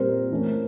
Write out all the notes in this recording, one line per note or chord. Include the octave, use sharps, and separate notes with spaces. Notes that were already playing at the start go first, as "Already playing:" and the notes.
Already playing: A#2 G3 C4 A#4 C5
E3 A3 C#4